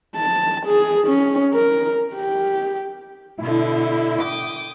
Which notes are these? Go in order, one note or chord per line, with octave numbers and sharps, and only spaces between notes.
A5
G#4
C#4
A#4
G4
B2 D3 E4
G5 D6 D#6